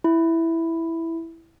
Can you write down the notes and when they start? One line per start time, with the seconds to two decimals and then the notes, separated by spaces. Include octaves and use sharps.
0.04 E4